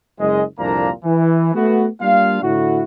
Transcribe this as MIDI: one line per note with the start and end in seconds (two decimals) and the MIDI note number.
0.19 0.43 30
0.19 0.43 56
0.19 0.43 75
0.59 0.89 36
0.59 0.89 41
0.59 0.89 46
0.59 0.89 58
0.59 0.89 62
0.59 0.89 82
1.04 1.53 52
1.54 1.87 57
1.54 1.87 59
1.54 1.87 66
2.00 2.41 55
2.00 2.41 58
2.00 2.41 62
2.00 2.41 65
2.00 2.41 77
2.43 2.84 45
2.43 2.84 50
2.43 2.84 64
2.43 2.84 66